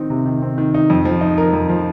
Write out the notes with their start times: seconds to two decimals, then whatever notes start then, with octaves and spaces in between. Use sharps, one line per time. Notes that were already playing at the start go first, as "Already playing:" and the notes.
Already playing: D#3 C4 D#4
0.10 C3
0.26 D#3
0.42 C4
0.58 D#3
0.74 D#4
0.90 F2
1.05 F3
1.21 D#4
1.38 A#4
1.53 F2
1.69 F3